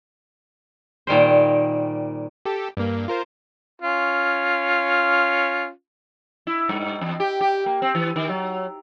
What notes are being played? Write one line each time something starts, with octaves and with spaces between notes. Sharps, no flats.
A#2 D#3 G3 C5
G4 A4
G2 A#3
F4 A#4 C5
C#4 F4
E4
G2
E2
G4
G4
A#3
C4
E3
D#3
F#3